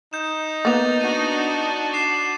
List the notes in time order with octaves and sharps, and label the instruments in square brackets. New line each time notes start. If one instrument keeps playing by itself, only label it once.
[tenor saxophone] D#4 [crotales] G6 E7
[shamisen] A#3 B3 [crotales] A6 F7
[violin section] D4 F#4 A5 [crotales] D#7
[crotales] D6 C7 E7